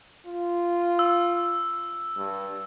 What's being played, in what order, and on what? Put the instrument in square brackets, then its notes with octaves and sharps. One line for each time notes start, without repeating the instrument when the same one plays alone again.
[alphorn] F4
[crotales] E6
[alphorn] G2